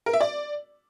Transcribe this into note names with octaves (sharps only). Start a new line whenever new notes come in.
A#4
E5
D5